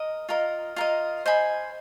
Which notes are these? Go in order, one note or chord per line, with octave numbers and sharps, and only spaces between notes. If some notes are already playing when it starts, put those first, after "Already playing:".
Already playing: A#4 D#5
F4 A#4 D#5
F4 A#4 D#5
C5 D#5 G#5 B5